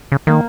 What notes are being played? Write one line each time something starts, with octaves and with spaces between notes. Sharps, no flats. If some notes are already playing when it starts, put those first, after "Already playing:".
C#3
D#3 A#3